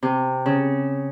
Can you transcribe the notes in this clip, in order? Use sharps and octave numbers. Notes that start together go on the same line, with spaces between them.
C3
C#3